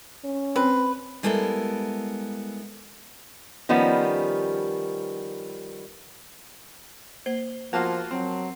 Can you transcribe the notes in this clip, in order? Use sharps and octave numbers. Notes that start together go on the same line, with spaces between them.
C#4
C4 B4
G3 G#3 B3 E4 A4 A#4
D#3 F3 G3 B3 C#4
A#3 C5
F3 A#3 B3 F4 F#4 A#4 A5
F#3 C4